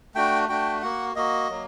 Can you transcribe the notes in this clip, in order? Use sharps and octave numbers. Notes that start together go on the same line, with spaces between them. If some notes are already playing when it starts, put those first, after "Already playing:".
A3 D4 F#4 G5
A3 D4 F#4 G5
A#3 F#4 F#5
A#3 F#4 D#5
F#3 A#3